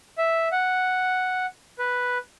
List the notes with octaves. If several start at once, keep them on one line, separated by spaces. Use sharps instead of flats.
E5
F#5
B4